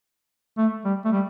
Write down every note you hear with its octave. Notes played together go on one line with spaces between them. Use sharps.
A3
G3
A3
G3